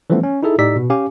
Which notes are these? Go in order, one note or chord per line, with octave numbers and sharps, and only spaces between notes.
E3 F3 G3 A3 B3 C#4
C#4
D#4 E4 G#4 A4 E5
A2 D#4 G4 D5 E6 B6
B2
C#4 G4 F5 G#5 D6